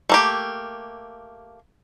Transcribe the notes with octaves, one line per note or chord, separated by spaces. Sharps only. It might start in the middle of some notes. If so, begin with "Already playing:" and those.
A3 A#3 G4